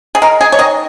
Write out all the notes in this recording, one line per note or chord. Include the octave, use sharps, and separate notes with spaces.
G#4
G#3 A#4
G#4
C#5
D#3 D#5